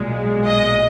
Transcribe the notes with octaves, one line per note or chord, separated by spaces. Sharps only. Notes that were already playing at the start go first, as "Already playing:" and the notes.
Already playing: B1 A#2 G#3
D#5